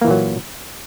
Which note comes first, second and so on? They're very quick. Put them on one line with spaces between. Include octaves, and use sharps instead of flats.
A#3 E3 A#2 F#3